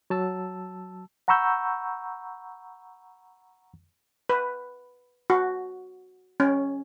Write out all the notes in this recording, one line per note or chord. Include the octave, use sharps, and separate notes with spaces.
F#3 A5 E6
F#5 A#5 B5 C#6 E6 G6
B4
F#4
C#4